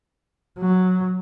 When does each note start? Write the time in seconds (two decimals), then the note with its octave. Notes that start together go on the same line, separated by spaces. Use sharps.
0.58 F#3